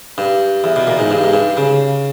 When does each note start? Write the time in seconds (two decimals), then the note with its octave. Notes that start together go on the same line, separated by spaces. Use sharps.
0.18 G2
0.64 E2
0.76 B2
0.87 A#2
0.99 G#2
1.11 G2
1.24 G#2
1.34 G2
1.57 C#3